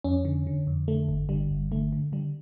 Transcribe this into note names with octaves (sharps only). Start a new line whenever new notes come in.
F2 C#4
D3
D3
F2
D3 A3
G1
D3 G3
G1
D3 A3
D3
D3 G3